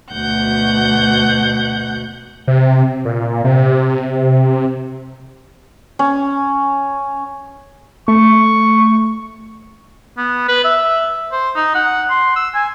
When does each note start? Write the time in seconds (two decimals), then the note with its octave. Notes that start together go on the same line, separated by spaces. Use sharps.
0.13 D2 B2 F#5 G6
2.47 C3
3.05 A#2
3.44 C3
5.99 C#4
8.08 A3 C#6
10.17 B3
10.48 B4
10.65 E5
11.32 C5
11.55 D#4
11.75 F#5
12.10 C6
12.36 E6
12.54 G#5